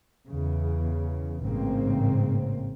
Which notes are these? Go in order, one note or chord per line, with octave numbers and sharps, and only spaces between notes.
E2 C#3
A1 G#2 C#3 A#3 C4